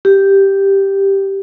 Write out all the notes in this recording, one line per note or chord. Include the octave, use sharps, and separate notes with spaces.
G4